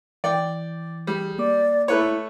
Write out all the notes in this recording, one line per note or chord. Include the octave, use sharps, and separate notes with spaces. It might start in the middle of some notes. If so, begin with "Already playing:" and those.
E3 D5 G5
G3 G#4
A#3 D5 D6
A3 E4 B4 C#5